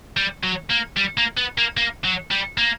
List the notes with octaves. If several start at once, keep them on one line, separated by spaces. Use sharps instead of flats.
G3
F#3
A#3
G3
A#3
B3
A#3
A#3
F#3
G3
A#3